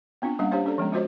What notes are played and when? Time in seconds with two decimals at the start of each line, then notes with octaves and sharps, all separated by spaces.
0.22 B3 C4 D4 F4
0.39 G3 A#3 C#4 D4 F5 F#5
0.51 D4 G4 C5 C#5 F5
0.65 C#4 D4 A4 D5
0.78 F3 G#3 B3 C#4
0.92 G#3 F4 F#4 C5 C#5 D#5